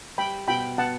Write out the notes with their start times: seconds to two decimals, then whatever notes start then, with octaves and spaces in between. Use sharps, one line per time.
0.18 G3 G5 B5
0.48 B2 G5 B5
0.78 B3 F#5 A5